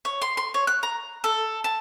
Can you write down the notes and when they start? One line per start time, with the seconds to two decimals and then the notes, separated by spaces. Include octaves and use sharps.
0.05 C#5
0.22 C6
0.37 C6
0.54 C#5
0.67 F#6
0.83 A#5
1.24 A4
1.64 A5